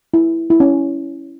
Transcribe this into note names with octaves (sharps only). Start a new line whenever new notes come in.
E4
E4
C#4